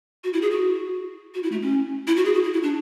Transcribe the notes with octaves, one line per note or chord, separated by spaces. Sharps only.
F#4
E4
G#4
F#4
F#4
E4
A3
C#4
E4
F#4
G#4
F#4
E4
E4
D4